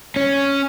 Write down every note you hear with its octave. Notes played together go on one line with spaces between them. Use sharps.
C#4